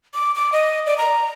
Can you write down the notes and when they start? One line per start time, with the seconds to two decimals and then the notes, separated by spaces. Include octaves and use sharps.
0.14 D6
0.35 D6
0.52 D#5
0.86 D5
0.98 A#5